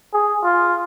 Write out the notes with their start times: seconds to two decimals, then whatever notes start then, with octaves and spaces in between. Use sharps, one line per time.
0.14 G#4
0.44 F4